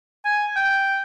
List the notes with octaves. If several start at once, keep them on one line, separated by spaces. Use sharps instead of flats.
G#5
G5